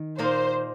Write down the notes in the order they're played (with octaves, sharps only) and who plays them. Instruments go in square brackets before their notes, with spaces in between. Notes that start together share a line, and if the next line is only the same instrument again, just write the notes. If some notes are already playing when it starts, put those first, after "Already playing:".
Already playing: [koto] D#3
[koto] A#2 A#3 D#4 [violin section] C5